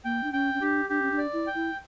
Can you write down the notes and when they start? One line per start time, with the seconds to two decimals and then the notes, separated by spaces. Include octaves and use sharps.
0.04 A#3 G5
0.23 D4
0.32 C#4 G5
0.54 C#4
0.61 D4 G4
0.89 D4 G4
1.02 C#4
1.11 D4
1.18 D5
1.33 E4
1.47 G5
1.54 E4